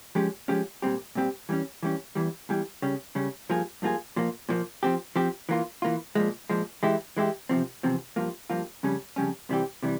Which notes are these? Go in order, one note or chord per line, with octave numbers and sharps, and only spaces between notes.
F3 G#3 C#4 G4
F3 G#3 C#4 G4
A#2 G3 C4 G4
A#2 G3 C4 G4
E3 G3 C#4
E3 G3 C#4
E2 E3 G3
E2 E3 G3
C#3 G3 C#4
C#3 G3 C#4
G2 F3 A#3 F4 G#4
G2 F3 A#3 F4 G#4
A#2 F3 A#3
A#2 F3 A#3
F3 C4 G4
F3 C4 G4
E3 A#3 F4
E3 A#3 F4
A#2 F3 G#3
A#2 F3 G#3
E3 G#3 E4 G4
E3 G#3 E4 G4
E2 C3 F3 C4
E2 C3 F3 C4
G2 F3 A#3 F4
G2 F3 A#3 F4
F2 C#3 G3 C#4
F2 C#3 G3 C#4
C3 E3 G3 C4 G4
C3 E3 G3